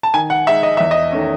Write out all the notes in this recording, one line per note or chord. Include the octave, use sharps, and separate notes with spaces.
A5
D#3 G#5
F#5
G#3 D#4 E5
D#5
E2 E5
D#5
D#3 A3 C#4